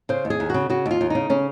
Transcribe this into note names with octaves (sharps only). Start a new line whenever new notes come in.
C#3 C5
D#2
G#4
D#2
C#3 F#4
C#3 F#4
D#2
F4
D#2
C#3 D#4
C#3 C#4